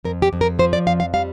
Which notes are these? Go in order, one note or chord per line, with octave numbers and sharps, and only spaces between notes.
F2 A#4
G4
F2
A#4
F3 C5
D5
F2 F5
F5
G3 F5